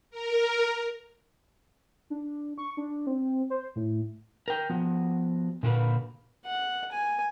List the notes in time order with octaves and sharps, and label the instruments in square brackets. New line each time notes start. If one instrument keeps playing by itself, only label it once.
[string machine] A#4
[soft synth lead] D4
C#6
D4
C4
C5
A2
[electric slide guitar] A#4 G5
F3 B3 F#4
A#2 D3 A#3 F#4 B4 F5
[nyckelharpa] F#5
G#5